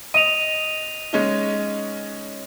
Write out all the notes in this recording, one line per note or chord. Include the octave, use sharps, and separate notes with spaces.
D#5 D#7 F7
G#3 C#4 D#4